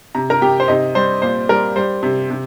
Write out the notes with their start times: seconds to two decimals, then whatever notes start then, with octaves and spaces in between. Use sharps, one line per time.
0.15 C3 A#5
0.30 A#4 A#5
0.42 C3 G4 G5
0.60 C5
0.68 C3 D#4 D#5
0.95 G3 C5
1.22 A#2 C5
1.49 G3 A#4
1.76 G3 C5
2.03 C3
2.30 C3